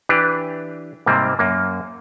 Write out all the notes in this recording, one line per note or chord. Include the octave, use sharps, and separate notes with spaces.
E3 D4 G4 B4
G#2 C3 G3 A#3 C4
F#2 A#3